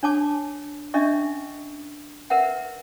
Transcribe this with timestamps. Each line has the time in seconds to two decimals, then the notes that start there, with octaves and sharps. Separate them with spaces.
0.03 D4 C#5 A5 D6
0.94 C#4 D4 D#5 E5 C#6
2.30 A#4 B4 E5 F#5